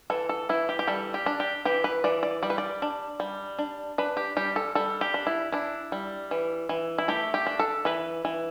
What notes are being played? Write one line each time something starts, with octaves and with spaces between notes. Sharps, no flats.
E3 A4
A4
E3 E4
G4
G4
G3 A4
G4
D4
G4
E3 G4
B4
E3 D5
D5
G3 D5
B4
D5
D4
G3
D4
D4 B4
G4
G3 G4
A4
G3 A4
G4
D4
E4
D4 E4
G3
E3
E3
E4
A3 G4
G4
D4
A4
E3 B4
E3